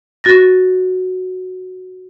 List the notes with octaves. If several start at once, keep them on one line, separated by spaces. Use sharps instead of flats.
F#4 A6 A#6